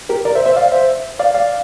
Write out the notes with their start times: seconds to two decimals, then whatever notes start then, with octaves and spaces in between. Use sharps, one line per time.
0.09 G4 A#4
0.25 A#4 D5
0.35 C5 E5
0.45 C5 E5
0.56 D5 F5
0.72 C5 E5
1.19 D5 F5
1.34 D5 F5